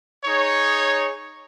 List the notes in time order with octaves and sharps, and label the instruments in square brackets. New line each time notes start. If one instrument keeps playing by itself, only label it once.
[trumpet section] D#4 G#4 C#5